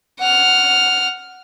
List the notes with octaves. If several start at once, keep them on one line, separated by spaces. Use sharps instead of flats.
F#5 F6